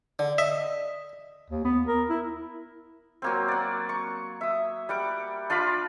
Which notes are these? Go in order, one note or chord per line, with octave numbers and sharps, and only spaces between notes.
D3 D5
D#5 E5
D#2
B3
A#4
E4
F#3 A#3 C4
D5 F#5
C#6
E5 D#6
G3 F#5 D6
D4 F4 F5 B5